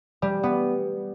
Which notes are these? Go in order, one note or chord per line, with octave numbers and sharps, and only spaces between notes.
G3
B3